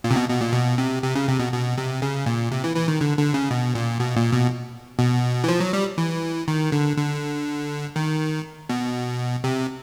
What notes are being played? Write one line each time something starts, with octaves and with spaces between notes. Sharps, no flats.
A#2
C3
B2
B2
A#2
B2
C3
C3
C#3
C3
B2
B2
C3
C#3
A#2
C3
E3
E3
D#3
D3
D3
C#3
B2
A#2
B2
A#2
B2
B2
E3
F3
F#3
G3
E3
D#3
D3
D3
D#3
B2
C3